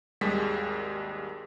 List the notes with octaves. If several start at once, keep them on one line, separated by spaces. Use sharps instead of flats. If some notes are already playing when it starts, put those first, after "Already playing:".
G#1 D#2 G3 G#3 B6